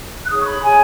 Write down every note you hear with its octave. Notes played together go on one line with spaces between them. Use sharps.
F#6
D#4 G#4 C#5 D#6
C#6
B5
D#4 G#4 C#5 G#5